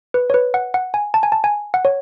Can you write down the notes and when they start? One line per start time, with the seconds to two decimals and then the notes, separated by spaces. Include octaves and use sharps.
0.14 B4
0.30 C#5
0.34 B4
0.54 F#5
0.74 F#5
0.94 G#5
1.14 A5
1.23 G#5
1.32 A5
1.44 G#5
1.74 F#5
1.85 C#5